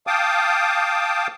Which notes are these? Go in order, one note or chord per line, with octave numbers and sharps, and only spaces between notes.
F5 G5 A5 D6 D#6